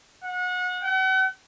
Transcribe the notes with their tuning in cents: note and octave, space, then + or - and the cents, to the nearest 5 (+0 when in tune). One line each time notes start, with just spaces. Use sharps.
F#5 -30
F#5 +40